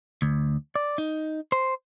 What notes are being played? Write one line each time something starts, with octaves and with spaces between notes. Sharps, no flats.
D2
D5
D#4
C5